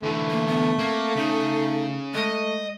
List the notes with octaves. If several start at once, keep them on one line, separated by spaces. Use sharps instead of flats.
D3 E3 A3
A#3
B3
A#3 C4
C#3 D#4
G#3 A3 D#5